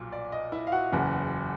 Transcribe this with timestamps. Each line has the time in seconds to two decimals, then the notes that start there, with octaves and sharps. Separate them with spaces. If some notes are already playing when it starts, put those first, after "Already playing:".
Already playing: B1 A#2 F3
0.12 D5
0.32 D#5
0.52 E4 E5
0.67 F5
0.72 F#4 F#5
0.92 F#1 E2 C#3